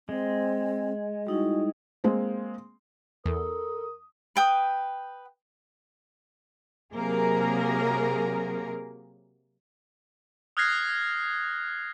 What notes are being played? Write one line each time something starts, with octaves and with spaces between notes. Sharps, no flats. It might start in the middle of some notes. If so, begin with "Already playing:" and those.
G#3 C4
G3 D#4 E4 F#4
G#3 A#3 C4
E2 A4 A#4 D#6
B4 G5 D#6
C3 F#3 A#3 G#4 A#4
D#6 F6 F#6 G#6 A#6 C7